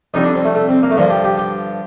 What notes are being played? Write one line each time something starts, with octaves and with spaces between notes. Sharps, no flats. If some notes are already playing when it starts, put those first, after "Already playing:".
F2 D3 G3 D#4
D4
C4
A3
A3
C4
A#3
A3
G2 D3 F3 A#3
G4
G4
G4